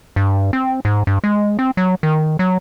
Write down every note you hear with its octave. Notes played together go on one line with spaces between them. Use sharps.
G2
C4
G#2
G2
G#3
C4
F#3
D#3
F#3